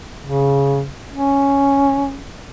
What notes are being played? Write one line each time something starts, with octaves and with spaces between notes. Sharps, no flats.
C#3
C#4